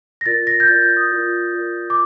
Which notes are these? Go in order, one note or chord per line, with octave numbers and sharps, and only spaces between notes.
A#6
F4 A#4 D5 A6
A#6
G6
F4 A#4 D5 A6
G6
D#6
F4 A#4 D5
F4 A#4 D5
D6